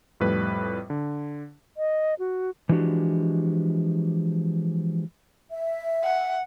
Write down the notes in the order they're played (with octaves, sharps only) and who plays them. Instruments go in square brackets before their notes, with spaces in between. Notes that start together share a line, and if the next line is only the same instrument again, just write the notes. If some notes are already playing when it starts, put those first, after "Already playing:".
[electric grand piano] F2 A2 G3 B4
D3
[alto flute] D#5
F#4
[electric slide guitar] E3 F3 G#3 D4 F#4 G4
[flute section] E5
[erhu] F#5